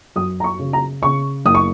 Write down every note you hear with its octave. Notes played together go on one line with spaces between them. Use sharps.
F#2 D#6
A#5
C#6
C#3
A#5
C#3 C#6
F#1 D#6
C#6